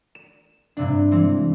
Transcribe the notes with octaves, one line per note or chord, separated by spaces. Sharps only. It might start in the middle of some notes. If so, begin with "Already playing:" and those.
E7
G2 C3 D4
E3 G#3 C4